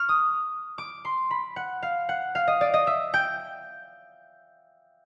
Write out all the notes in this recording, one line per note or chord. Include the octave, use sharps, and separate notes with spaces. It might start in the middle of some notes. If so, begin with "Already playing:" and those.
Already playing: C#6 F6
D#6
D6
C6
B5
F#5
F5
F#5
F5
D#5
D5
D#5
E5
G5